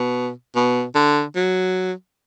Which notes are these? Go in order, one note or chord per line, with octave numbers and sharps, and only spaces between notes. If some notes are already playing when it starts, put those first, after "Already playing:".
Already playing: B2
B2
D3
F#3